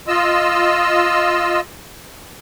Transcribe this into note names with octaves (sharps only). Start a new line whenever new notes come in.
F4 D#5 E6